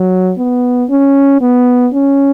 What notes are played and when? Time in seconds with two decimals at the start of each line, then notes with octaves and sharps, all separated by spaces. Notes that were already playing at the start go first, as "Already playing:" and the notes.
Already playing: F#3
0.38 B3
0.90 C#4
1.41 B3
1.93 C#4